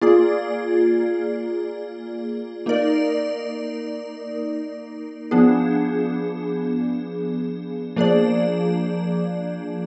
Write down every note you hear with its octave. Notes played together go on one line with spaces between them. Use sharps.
A#3 F4 G#4 D5
A#3 D#4 A#4 D5
F3 B3 D4 G#4
F3 A#3 D4 G#4 D5